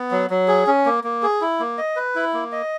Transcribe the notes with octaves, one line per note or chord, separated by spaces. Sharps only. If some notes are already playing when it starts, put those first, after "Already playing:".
Already playing: B3
F#3
F#3
G#4
C#4
A#3
A#3
G#4
E4
A#3
D#5
B4
E4
A#3
D#5